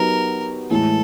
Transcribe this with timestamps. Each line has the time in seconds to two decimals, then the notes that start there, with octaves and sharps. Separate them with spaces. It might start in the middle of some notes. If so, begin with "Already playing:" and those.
Already playing: F#3 B3 D#4 G4 A#4 B4
0.70 A2 E3 G#3 A4